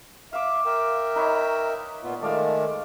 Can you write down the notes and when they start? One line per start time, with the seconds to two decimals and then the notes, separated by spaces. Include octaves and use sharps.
0.33 E5 F5 D6
0.65 A#4 E5 G5
1.16 D#4 B4 C#5
2.04 A#2 B3 F4
2.21 D#3 G#3 A3 A4 D5 F5